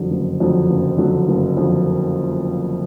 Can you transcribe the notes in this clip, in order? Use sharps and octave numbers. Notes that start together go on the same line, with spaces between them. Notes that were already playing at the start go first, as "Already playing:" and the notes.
Already playing: F#1 F2 D3 F#3
F#1
F2 D3 F#3
F#1
F2 D3 F#3
F#1
F2 D3 F#3